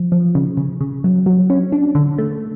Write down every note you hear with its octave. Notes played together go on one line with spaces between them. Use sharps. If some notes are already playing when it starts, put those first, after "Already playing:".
Already playing: F3
F3
C#3
C#3
C#3
F#3
F#3
C#4
D4
D3
A3